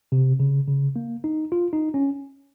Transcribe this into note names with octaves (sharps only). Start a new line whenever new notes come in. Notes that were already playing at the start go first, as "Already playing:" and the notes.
C3
C#3
C#3
A#3
D#4
F4
D#4
C#4